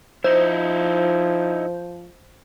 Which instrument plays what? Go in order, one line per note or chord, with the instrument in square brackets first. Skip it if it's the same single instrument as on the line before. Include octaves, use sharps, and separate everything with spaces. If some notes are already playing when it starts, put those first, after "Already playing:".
[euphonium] F3 [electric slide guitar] D#4 E4 [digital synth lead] C5